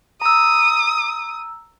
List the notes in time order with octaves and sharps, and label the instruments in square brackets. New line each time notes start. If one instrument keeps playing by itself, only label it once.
[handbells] A#5 E6 [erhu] D#6